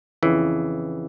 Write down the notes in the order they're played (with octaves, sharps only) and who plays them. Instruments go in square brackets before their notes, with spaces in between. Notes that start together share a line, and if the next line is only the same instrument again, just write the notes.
[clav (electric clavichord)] F2 C#3 E3